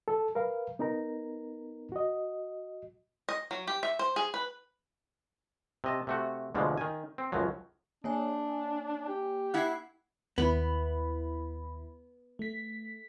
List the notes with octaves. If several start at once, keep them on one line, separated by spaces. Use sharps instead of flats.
A4
A#4 B4 F5
B3 D#4 A#4 A#5
F#4 D#5
D#5
F#3
G4
E5
C5
G#4
B4
C3 D#5 A5
C3 A3 F#4
D2 B2 D3 F3 G#3
D#3 G#5
C4
C#2 F#2 F3 F#3
A#3 D4 C#5 G#5
G4
E4 F#5 F#6 G#6 C7
D#2 B3 E4 B5
A3 B6